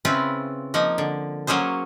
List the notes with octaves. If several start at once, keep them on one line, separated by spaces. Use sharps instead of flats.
C#3 C4 E4 F4 B4
F3 A#3 D#4
D3
F#3 A#3 C#4 G#4 C5